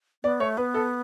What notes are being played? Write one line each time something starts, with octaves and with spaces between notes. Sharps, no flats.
B3 D5
A3 C#5
B3 B4
A4